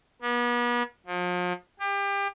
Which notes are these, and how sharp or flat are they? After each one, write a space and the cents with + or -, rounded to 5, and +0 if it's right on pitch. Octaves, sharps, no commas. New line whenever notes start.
B3 -40
F3 +40
G4 +30